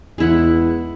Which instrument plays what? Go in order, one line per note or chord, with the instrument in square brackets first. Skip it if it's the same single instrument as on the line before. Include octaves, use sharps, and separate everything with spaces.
[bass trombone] E2 [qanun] G#3 E4 F#5